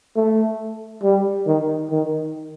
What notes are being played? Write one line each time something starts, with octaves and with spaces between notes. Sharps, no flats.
A3
G3
D#3
D#3